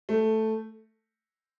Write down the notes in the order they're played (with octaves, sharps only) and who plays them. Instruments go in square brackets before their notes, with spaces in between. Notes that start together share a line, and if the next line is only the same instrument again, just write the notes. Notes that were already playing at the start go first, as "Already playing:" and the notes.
[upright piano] A3